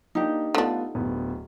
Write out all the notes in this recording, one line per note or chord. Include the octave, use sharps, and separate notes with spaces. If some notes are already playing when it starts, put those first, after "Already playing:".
A#3 D4 D#4 G4
D3 A3 B3 D4 F4
D1 B3